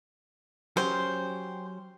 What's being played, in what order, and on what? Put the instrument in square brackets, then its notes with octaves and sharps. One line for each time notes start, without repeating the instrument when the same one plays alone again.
[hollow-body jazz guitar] F#3 C#4 G4 [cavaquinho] C5